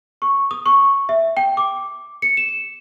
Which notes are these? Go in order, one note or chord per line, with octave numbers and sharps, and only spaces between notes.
C#6
D#6
C#6
E5
G5
D6
C#7
E7